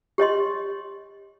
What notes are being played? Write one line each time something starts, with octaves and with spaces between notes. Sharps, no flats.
G4 C#5 D#5 C6